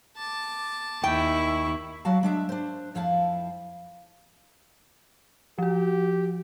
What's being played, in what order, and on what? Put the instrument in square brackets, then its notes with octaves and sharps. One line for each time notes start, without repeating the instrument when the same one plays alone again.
[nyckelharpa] A5 D6
[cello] D#2 E4 [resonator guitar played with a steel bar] G5 [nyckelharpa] C#6
[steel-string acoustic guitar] F#3 F#4 F5 A5
G#3 D4 E5
D4 C5
F2 F3 E4 F5 A5
[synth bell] F3 F#4 [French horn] G4